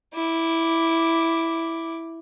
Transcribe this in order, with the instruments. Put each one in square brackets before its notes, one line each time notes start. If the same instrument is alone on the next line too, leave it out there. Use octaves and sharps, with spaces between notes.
[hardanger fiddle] E4 D6